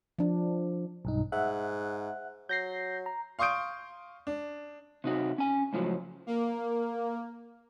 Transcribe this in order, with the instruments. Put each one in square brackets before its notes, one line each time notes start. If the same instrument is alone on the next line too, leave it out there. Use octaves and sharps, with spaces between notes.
[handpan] F3 D4
[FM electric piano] B1 G2 D#4
[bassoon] G#2 [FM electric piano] E5 F#5 F#6
[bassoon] F#3 [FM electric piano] G6 A#6 C7
[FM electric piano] A#5
[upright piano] F5 C6 C#6 D#6 G6 D7
D4
[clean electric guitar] C3 D#4 F#4
C#4 G#5
C#2 A2 F3 F#3
[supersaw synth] A#3